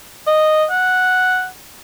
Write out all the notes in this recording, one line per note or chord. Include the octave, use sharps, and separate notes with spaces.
D#5
F#5